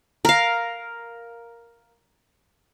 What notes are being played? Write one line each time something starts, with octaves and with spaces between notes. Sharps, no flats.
A#4 F5